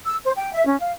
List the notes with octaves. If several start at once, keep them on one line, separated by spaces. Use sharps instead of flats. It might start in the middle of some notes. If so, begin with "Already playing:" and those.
E6
C5
G5
E5
C#4
F5